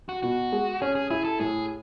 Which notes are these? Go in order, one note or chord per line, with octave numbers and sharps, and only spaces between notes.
F#4
B2 F#4
G#3
C#4 G#4
G#4
E4 G#4
A4
A2 G#4